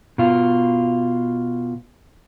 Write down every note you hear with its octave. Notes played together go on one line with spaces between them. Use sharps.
B2 F4